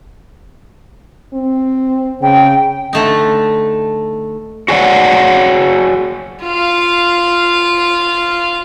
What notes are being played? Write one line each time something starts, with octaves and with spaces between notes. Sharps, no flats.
C4
C#3 G5
D3 A3 D#4
F#4 G#4 C#5 D5 F#5
F4 F5